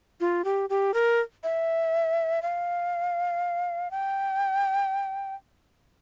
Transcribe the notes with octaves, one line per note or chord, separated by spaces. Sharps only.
F4
G4
G4
A#4
E5
F5
G5